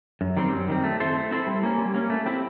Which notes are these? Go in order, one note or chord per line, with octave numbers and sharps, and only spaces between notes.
F#2
D#3 G3 C4
F#2
D#3 G3 C4
A3
C4 E4 A4 C5
A3
C4 E4 A4 C5
G3
A#3 C#4
G3
A#3 C#4
A3
C4 E4 G4